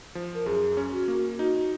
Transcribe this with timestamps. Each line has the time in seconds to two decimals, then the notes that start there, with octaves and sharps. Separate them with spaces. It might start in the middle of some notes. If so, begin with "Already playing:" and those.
0.15 F3
0.35 A#4
0.46 F#2 G#4
0.77 C#4
0.92 F#4
1.08 A#3
1.39 D#4 F#4